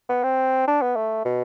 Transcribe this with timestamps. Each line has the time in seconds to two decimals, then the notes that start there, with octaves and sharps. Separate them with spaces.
0.09 B3
0.23 C4
0.67 D4
0.82 B3
0.96 A3
1.25 B2